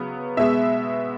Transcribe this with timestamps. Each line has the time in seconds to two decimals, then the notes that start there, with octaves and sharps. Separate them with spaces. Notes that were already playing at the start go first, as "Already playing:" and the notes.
Already playing: C#3 F#3 B3
0.37 B2 G#3 B3 E5